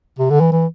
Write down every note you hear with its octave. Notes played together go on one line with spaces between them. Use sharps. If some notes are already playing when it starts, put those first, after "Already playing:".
C3
D3
E3
E3